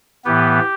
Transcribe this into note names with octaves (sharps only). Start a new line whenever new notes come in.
A2 E3 B3 G4